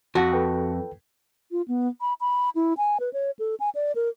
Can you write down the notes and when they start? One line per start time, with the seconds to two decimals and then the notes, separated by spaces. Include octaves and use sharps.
0.15 F2 F#4 A5
0.32 A4 B4 G5
1.51 F4
1.68 B3
2.01 B5
2.21 B5
2.55 E4
2.77 G#5
3.00 B4
3.13 C#5
3.39 A4
3.60 G#5
3.75 D5
3.96 A#4